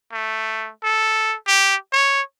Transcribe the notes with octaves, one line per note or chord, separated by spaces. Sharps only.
A3
A4
G4
C#5